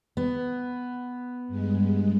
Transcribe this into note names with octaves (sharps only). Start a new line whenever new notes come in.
B3
G2 G#3